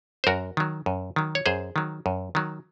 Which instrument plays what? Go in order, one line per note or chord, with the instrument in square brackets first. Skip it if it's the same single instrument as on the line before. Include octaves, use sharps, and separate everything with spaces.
[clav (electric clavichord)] C5
F#2 F#4 A#4
D#3 F#3
F#2
D#3 F#3
C#5
F#2 G#4 C5
D#3 F#3
F#2
D#3 F#3